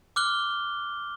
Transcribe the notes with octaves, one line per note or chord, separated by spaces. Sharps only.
D6 F6 F#6 G7